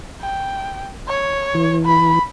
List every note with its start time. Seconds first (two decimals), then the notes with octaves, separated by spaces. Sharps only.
0.21 G5
1.08 C#5
1.55 E3
1.85 B5